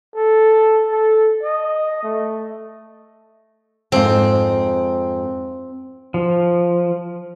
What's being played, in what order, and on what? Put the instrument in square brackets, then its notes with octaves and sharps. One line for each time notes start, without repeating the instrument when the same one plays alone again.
[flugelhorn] A4
A4
D#5
A3
[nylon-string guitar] F2 G#2 A#3 [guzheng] C4
[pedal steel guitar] F3